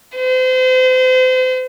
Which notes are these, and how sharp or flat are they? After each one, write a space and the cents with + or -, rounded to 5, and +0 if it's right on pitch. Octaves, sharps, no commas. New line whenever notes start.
C5 -35